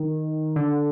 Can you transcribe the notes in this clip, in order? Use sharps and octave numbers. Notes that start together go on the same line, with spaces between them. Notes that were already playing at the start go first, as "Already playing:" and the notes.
Already playing: D#3
D3